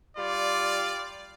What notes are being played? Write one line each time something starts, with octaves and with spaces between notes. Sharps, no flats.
G3 F4 D5